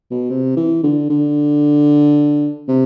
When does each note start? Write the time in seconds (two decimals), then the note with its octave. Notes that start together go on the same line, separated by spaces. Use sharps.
0.11 B2
0.30 C3
0.57 E3
0.84 D3
1.10 D3
2.68 C3